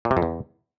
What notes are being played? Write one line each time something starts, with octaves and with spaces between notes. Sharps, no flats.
A#2
C3
F2
E2